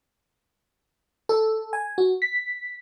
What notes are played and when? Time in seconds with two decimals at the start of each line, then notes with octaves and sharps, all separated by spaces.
1.29 A4
1.73 G#5
1.98 F#4
2.22 B6